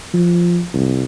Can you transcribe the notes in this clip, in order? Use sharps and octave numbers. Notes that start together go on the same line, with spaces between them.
F3
C2